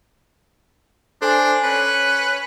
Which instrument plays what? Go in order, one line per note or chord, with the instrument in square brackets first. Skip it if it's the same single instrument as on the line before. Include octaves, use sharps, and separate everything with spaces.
[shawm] D4 [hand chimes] A4 G#5 [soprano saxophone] C5
[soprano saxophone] C#4 [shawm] B4
[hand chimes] C#7